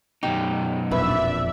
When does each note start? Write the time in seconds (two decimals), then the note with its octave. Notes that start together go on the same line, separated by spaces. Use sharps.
0.23 F#2 B2 D#4 G4
0.91 E1 A#1 F2 D4 B4 D5 E5